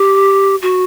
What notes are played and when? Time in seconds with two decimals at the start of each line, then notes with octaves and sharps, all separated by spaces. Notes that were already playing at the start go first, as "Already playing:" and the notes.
Already playing: G4
0.62 F#4